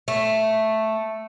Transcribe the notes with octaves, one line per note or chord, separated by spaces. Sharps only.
A3